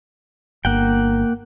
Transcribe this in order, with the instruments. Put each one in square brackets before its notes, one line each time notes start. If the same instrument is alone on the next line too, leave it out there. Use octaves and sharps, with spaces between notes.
[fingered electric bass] G1 [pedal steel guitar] A#3 F#5 G5